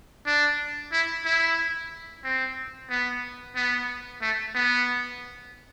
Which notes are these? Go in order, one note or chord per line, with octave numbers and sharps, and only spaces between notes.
D4
E4
E4
C4
B3
B3
A3
B3